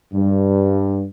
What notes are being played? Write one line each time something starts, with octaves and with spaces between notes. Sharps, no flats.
G2